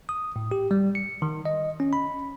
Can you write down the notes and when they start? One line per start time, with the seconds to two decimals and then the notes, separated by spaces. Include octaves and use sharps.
0.09 D#6
0.36 A2
0.51 G4
0.71 G3
0.95 C#7
1.22 D#3
1.45 D#5
1.80 C#4
1.93 B5